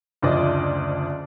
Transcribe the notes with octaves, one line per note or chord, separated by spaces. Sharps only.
F#1 D2 F3 D5 D#5